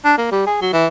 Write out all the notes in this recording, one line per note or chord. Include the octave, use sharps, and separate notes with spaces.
D4
A#3
G3
G#4
F#3
E3